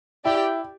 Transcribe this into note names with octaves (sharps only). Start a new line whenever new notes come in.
E4 G4 D5 G5